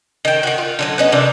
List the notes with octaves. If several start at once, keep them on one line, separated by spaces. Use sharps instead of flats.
D#3 G5
D#3 F#4
F4
D3 F3 F#3
B3 C#4 D#4
C3 E3 D4 A#4